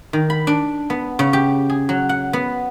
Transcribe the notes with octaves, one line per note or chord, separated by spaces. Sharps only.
D#3
B5
D4
B3
C#3
G4
G#4
F#3
F#5
B3